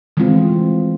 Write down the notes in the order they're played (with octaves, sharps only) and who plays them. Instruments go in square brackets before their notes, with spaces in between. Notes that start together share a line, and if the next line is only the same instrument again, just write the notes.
[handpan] E3 G#3 A3 B3 C4 F4